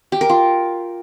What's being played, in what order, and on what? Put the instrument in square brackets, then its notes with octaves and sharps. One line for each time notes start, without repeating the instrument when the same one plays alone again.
[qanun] G4
A#4
F4